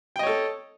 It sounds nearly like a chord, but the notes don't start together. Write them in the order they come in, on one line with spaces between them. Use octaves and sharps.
G5 D#5 C#5 A4